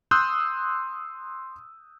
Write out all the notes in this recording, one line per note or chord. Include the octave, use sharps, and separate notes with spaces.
C6 D#6 E6 F#6 G6